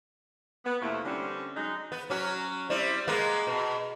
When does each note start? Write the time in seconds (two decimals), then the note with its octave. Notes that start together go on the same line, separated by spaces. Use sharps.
0.65 B3
0.81 F2 C3 A3 A#3 E4
1.05 D3 G3 C4 C#4
1.55 F#3 G#3 D#4
1.92 B3
2.10 F#3 C#4 F#4
2.70 G3 C4 E4
3.08 G#3 A#3 B3
3.47 B2